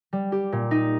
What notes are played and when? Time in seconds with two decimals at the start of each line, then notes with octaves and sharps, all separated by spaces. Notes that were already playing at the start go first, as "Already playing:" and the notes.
0.13 G3
0.32 G4
0.52 A#2
0.71 D#4